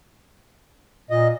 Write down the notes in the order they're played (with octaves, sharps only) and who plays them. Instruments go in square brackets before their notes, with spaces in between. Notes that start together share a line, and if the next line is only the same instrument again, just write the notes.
[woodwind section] A#2 [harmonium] D#5